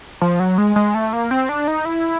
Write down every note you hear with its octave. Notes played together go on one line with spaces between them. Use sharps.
F3
F#3
G#3
G#3
A3
A#3
C4
D4
D#4
E4